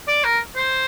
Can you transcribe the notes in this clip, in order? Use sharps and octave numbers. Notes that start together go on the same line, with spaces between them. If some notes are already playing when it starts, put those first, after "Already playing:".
D5
A#4
C5